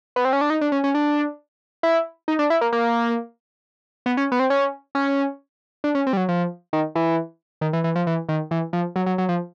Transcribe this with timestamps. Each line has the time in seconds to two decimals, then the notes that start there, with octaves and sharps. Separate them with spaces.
0.16 B3
0.25 C4
0.33 C#4
0.41 D4
0.50 D#4
0.61 D4
0.72 C#4
0.84 C#4
0.95 D4
1.83 E4
2.28 D#4
2.39 D4
2.50 E4
2.61 A#3
2.72 A#3
4.06 B3
4.17 C#4
4.32 B3
4.40 C4
4.50 C#4
4.95 C#4
5.84 D4
5.95 C#4
6.07 C4
6.13 G3
6.17 F#3
6.29 F3
6.73 D#3
6.95 E3
7.61 D#3
7.73 E3
7.84 E3
7.95 F3
8.07 E3
8.29 D#3
8.51 E3
8.73 F3
8.96 F#3
9.06 F#3
9.18 F#3
9.29 F3